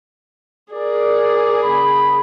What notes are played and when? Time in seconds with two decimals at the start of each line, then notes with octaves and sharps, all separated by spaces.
0.73 G#4 A#4 D5
1.63 C#3 A#3 B5